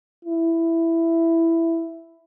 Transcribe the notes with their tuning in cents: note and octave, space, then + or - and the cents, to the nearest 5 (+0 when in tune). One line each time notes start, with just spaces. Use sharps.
E4 +5